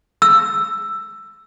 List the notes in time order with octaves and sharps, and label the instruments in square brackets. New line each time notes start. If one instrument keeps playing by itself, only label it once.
[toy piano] E6